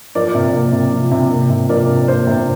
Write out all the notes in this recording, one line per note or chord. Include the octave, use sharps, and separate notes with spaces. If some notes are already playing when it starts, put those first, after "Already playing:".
F3 A#4 D5
C3
A#3
C3
F3
C3
A#3
C3
F3 A#4 D5
C3
A#3 C5
C3